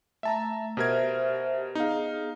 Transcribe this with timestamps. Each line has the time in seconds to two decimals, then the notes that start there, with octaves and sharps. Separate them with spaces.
0.23 A3 E5 A5 A#5
0.77 B2 G4 A#4 C5 E5 G#6
1.75 B3 D#4 G#4 F5